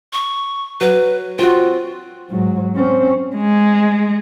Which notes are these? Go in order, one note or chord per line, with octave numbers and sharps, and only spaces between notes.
C#6
F#3 B4
C4 F4 F#4
G#2 F#3
C4 C#4
G#3